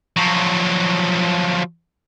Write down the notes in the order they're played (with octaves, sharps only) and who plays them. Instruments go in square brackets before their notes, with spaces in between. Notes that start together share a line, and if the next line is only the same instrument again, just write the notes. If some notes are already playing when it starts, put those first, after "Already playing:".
[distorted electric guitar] F3 F#3